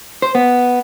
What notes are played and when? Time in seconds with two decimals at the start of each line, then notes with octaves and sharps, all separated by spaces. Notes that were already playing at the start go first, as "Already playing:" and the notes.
0.22 C5
0.35 B3